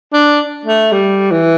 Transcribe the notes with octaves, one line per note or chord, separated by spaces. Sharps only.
D4
A3
G3
E3